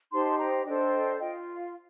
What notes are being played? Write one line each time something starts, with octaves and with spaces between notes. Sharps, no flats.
D#4 G4 C5 A5 C6
G5 A#5
D4 A4 C5 D#5 G5
F4 D#5 G5